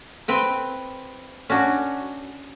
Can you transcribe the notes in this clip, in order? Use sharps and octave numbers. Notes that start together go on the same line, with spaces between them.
C4 B4 G5
C#4 D4 F#4